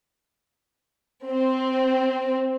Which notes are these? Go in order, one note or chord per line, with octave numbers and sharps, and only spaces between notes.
C4